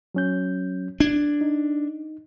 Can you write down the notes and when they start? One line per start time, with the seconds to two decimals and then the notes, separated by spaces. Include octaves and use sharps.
0.14 F#3 C#4 G6
1.00 D4 G#6
1.41 D#4